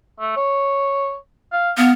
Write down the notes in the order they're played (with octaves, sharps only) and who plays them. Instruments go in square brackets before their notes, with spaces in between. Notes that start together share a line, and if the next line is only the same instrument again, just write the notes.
[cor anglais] A3
C#5
F5
[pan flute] B3 [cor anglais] F5